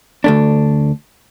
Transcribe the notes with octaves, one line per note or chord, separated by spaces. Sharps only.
D2 A3 D4